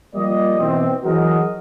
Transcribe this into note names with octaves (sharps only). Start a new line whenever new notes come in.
F3 G3 A#3 D5 D#5
B2 E3 C4
E3 F#3 F#4 G#4 A#4 D#5